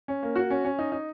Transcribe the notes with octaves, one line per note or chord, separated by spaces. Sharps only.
C#4
A#3
F#4
C#4
C#4
D#4
D#4